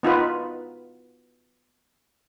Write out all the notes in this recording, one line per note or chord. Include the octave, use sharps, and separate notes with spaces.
B3 D#4 F4 B4